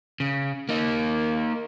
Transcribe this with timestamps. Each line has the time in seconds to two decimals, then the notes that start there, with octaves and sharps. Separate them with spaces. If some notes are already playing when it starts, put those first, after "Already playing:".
0.20 C#3
0.69 A#3 D#4